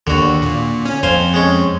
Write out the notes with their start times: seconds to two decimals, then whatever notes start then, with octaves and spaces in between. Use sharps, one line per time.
0.07 D#2 D3 F#4
0.42 A#2
0.85 C#4
1.03 F2 C5 F5 G#5
1.34 G#3 C#4